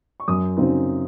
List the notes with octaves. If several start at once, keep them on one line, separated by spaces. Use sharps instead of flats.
C#6
F#2 D#6
C#3 F#3 C4 D#4